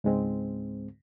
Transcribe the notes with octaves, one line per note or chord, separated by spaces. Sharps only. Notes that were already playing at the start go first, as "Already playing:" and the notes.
C#2 G#2 G#3 C4